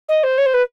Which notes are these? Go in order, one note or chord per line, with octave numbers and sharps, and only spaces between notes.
D#5
C5
C#5
C5
B4